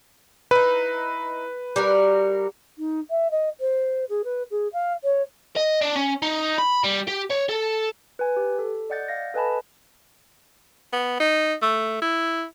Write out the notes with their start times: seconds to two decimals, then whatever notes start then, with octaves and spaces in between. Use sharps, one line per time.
0.51 D#4 E4 B4
1.76 G3 F#4 A#4
2.78 D#4
3.10 E5
3.31 D#5
3.60 C5
4.09 G#4
4.24 B4
4.50 G#4
4.73 F5
5.03 C#5
5.56 D#5
5.81 D4
5.96 C#4
6.22 D#4
6.58 B5
6.83 G3
7.07 G4
7.30 C#5
7.49 A4
8.19 B4 G#5
8.37 G4
8.59 A4
8.90 D5 D#5 F#5 G6 A6
9.08 F5 A#6
9.34 A4 B4 D#5 G#5 A5 B5
10.93 B3
11.20 D#4
11.62 A3
12.02 E4